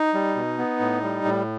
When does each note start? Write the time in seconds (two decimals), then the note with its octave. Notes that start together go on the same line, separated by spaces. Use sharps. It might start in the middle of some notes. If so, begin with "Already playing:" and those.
Already playing: D#4
0.14 G3
0.35 B2
0.59 B3
0.80 A2
1.03 G3
1.24 A2